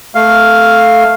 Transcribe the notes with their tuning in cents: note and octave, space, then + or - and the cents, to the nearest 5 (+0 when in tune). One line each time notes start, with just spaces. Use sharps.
A3 +0 F5 +0